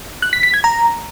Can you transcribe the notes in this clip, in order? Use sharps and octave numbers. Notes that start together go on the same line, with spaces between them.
F#6
B6
B6
G#6
A#5